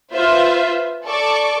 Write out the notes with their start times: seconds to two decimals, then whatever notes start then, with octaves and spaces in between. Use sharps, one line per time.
0.13 F4 B4 C5 E5
1.05 A4 D5 C#6 D6